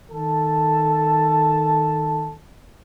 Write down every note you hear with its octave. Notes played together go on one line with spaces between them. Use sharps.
D#3 A4 A5